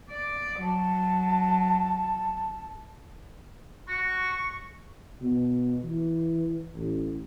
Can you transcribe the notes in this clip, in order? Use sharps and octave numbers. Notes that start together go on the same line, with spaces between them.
D5
F#3 A5
F#4 C#6
B2
E3
A1